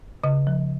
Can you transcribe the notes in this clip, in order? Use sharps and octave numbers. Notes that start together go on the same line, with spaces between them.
C#3 D#5
F3